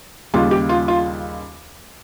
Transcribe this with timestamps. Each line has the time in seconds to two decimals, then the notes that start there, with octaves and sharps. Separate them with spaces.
0.34 D#2 C#3 G3 F4
0.51 G4
0.69 F4
0.88 F4